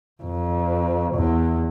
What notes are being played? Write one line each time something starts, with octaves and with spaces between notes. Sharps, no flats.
F2
E2